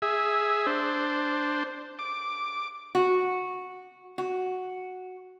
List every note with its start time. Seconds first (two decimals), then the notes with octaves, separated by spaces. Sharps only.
0.02 G#4 E5
0.67 D4 C5
1.99 D6
2.95 F#4
4.18 F#4